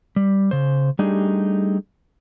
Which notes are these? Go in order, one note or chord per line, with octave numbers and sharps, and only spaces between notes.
G3
C#3 C5
G3 A3 D4 D#4 G4 G#4